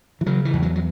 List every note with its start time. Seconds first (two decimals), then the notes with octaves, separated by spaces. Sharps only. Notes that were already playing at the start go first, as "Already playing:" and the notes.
0.21 E3
0.26 C#3 F#3
0.45 E3
0.53 E2
0.62 F#3
0.75 F#3